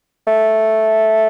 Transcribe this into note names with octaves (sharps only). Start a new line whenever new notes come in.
A3